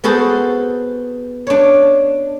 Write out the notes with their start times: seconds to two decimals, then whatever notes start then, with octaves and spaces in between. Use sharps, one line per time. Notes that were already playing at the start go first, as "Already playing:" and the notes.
0.04 B3 F#4 G#4 A4 C5
1.47 D4 C#5